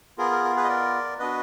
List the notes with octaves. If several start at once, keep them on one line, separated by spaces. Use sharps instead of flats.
B3 F4 G#4 A#4
A#4
A#4
G#4 B4
D#5
A#4 D5
B3 D4 F#4 B4 D#5